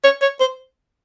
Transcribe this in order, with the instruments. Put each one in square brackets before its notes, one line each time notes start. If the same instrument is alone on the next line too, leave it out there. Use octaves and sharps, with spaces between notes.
[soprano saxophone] C#5
C#5
C5